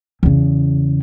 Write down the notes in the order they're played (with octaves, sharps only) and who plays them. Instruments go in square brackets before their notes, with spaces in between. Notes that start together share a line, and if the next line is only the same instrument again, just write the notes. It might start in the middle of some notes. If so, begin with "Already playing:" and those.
[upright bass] E2 C#3